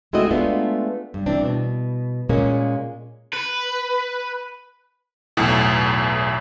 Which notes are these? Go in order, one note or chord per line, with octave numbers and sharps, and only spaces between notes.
G#3 A3 C4 E4 F#4 D#5
G#3 A3 B3 D4 F4
G2
E3 C4 D4
B2
A#2 G#3 A#3 C#4
B4
B1 E2 A2